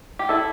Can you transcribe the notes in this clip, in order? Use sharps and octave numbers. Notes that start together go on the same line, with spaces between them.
G4
E4 A4